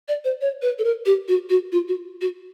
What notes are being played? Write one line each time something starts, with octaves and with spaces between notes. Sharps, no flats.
D5
C5
C#5
B4
A4
A#4
G4
F#4
F#4
F4
F#4
F#4